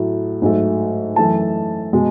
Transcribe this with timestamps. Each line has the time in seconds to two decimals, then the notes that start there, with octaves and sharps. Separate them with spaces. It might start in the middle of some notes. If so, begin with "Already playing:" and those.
Already playing: A2 F#3 A3
0.42 G#2 F#3 A3
1.16 F#2 E3 A3 A5
1.93 B2 G#3